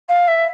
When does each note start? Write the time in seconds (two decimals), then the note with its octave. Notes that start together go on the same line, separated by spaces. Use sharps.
0.09 F5
0.27 E5